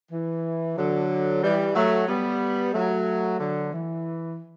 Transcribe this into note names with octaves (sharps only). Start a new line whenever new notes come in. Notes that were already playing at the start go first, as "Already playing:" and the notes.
E3
D3 F#3
E3 G3
F#3 A3
G3 B3
F#3 A3
D3 F#3
E3